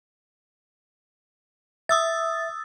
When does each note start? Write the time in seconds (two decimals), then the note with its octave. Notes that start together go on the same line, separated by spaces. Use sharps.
1.89 E5 D#6 E6 A6